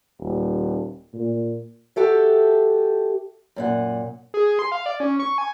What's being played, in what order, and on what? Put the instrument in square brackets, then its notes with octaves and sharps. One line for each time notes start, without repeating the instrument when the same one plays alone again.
[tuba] D#1
A#2
[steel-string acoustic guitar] F#4 G4 A4 E5
F#2 A#2 F#5
[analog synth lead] G#4
C6
F5
D5
C#4
C#6
G#5